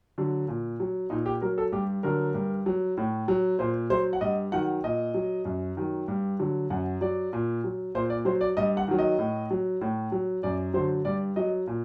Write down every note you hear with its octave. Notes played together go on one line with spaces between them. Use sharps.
D3 F#3
A#2
F#3
A#2 D#4
G4
F#3 A#4
A4
G2 G4
D3 F#3 A#4
G2
F#3
A2
F#3
A#2 C5
F#3 C5
F#5
G2 D#5
D#3 F#3 F#5
A#2 D#5
F#3
F#2
D#3 F#3
G2
D3 F#3
F#2 F#5
F#3 D5
A#2
F#3
A#2 C5
D5
F#3 C5
D5
G2 D#5
F#5
D#3 F#3
D#5
A2
F#3
A2
F#3
F#2 D5
D3 F#3 C5
G2 D5
F#3 D#5
A#2